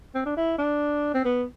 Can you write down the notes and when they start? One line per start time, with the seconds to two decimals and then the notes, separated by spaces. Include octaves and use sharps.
0.15 C4
0.26 D4
0.37 E4
0.58 D4
1.14 C4
1.25 B3